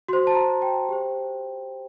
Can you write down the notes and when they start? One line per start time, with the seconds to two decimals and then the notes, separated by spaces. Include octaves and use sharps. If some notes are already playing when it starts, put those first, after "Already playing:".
0.08 F#4 C6
0.13 C5
0.27 A5
0.35 A#5
0.62 G5
0.89 G4 C5